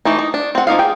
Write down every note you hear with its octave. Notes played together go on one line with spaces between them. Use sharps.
E3 A3 D#4
D#4
D4
C4 F#5
F3 A#3 D#4 F5
G#4 G5